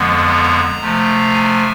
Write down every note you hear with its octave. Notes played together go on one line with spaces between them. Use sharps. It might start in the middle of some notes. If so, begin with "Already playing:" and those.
Already playing: F2 D3 F3 G#3 B3
A#5
C3 F3 A3
G#5